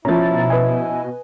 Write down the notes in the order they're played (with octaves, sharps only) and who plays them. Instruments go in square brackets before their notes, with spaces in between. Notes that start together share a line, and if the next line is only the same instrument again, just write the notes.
[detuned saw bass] B2 [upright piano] F3 C#4 [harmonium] E4 [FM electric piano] A#5 A6
[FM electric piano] B4 D#5 G#5